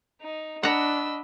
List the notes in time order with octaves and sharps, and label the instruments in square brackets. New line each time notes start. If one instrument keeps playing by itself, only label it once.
[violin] D#4
[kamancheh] D4 D#5 [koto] F#5 A#5 [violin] B5 E6